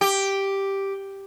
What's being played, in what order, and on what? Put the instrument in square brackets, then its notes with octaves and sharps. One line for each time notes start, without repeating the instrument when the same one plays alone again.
[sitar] G4